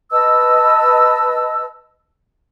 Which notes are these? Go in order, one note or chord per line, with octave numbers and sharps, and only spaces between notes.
B4 D#5 A5 E6